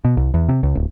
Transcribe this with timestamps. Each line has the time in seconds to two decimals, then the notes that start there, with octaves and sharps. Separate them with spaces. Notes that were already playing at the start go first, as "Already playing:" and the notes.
0.05 B2
0.17 C2
0.34 E2
0.48 C3
0.63 C#2
0.75 D1